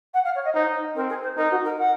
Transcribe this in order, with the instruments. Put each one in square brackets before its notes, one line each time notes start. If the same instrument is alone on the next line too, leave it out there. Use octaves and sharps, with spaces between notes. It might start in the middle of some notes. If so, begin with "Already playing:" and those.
[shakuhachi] F#5
F5
C#5
D#5
[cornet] D#4 [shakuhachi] C5
[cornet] C4 [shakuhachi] A#4
[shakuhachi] G#4
C5
[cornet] D#4 [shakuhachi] A#4
[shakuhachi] F#4
A#4
F#5